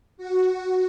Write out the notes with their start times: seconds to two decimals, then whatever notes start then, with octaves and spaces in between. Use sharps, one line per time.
0.17 F#4